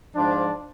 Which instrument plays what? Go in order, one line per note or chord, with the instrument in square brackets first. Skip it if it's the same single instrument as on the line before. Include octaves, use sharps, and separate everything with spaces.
[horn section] G#2 F3 D4